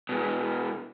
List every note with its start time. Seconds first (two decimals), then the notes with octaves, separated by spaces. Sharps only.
0.09 B2 G#3